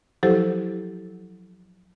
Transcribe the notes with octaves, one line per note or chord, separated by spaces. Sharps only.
F3 F#3 E4 G4 A4 C5